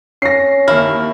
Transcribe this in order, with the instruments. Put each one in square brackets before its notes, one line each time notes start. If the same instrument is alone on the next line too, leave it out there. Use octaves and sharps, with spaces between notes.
[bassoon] C#4 [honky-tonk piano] A#6 C7
[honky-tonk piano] D#2 F6 [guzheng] E4